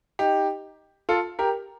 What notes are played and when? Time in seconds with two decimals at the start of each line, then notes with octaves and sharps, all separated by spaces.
0.19 D#4 G4
1.09 F4 A4
1.39 G4 A#4